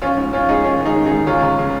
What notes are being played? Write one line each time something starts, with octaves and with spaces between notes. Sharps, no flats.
F3 C#4 F4
G#2
F3 C#4 F4
G#2 D#4 G#4
D#3 C#4 F4
G#2
D#4 G#4
D#3
D#4 G#4
G#2
C#2 C#4 F4
C#2
C#3